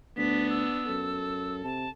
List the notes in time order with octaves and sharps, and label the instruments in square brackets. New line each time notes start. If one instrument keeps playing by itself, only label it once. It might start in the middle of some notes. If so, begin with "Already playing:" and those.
[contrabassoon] D2 [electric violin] B3 D4 [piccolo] B6
[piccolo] E6
[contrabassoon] F#2 [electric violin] A4
[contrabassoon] C3 [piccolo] A5